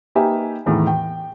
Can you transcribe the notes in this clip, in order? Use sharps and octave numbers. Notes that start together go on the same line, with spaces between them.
A#3 D#4 G4 B4 E5 G#5
E2 A2 D#3 E3
G5